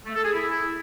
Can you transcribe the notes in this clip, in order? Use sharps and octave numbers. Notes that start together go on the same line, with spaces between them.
A3
A4
G#4
E4